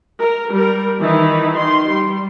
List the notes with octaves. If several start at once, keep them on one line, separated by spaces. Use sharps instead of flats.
A#4
G3 A#4
D#3 E3 D#4 E4
D#3 C6
G3